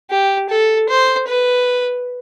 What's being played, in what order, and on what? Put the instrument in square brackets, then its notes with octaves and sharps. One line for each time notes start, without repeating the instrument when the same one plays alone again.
[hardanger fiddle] G4
A4
C5
B4